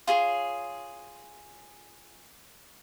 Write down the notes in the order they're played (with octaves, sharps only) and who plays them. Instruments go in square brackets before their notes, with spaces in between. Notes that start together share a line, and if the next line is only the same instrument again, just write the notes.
[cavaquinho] F4 G#4 C#5